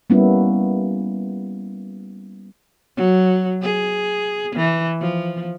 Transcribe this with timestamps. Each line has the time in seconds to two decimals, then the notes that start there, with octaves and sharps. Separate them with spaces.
0.10 G3 A#3 B3 C#4 E4
2.96 F#3
3.62 G#4
4.55 E3
5.01 F3